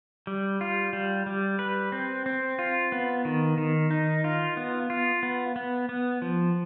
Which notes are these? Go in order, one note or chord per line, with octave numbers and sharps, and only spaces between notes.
G3
F4
G3
G3
B4
C4
C4
F4
B3
D#3
D#3
D#4
F4
B3
F4
B3
B3
B3
F3